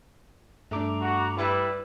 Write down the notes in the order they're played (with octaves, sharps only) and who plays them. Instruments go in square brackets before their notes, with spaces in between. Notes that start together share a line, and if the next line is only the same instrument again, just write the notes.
[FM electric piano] G2 D6 [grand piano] A3 D4 [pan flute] A#5
[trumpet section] F#4
[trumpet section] G3 E4 [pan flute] B4